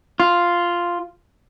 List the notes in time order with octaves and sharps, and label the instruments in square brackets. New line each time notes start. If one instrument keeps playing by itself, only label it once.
[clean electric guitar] F4